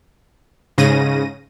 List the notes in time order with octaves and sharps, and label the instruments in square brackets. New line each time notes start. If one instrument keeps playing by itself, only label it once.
[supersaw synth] G#2 C#3 A#6 D#7